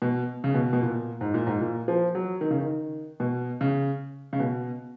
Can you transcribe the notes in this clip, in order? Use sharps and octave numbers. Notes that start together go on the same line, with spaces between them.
B2
C#3
B2
B2
A#2
G#2
A#2
G#2
A#2
F3
F#3
D#3
C#3
D#3
B2
C#3
C#3
B2